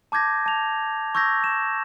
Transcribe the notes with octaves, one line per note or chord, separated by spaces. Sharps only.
A5 D6 G6 G#6 A#6
A5 F7
C#6 E6 G6 G#6 A#6
E7